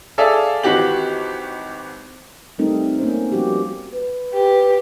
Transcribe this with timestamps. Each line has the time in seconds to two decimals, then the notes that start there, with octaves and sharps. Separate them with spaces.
0.18 G#4 A4 D5 E5 F5
0.63 G#1 E3 F#4 G4 F#7
2.58 G3 A3 C4 D#4 A4 A#4
3.00 A#3 C#4 C5
3.32 F3 G3 B3 C#4 F#4 G4
3.95 B4
4.34 G4